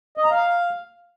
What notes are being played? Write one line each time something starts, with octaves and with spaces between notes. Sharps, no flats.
D#5
A#5
F5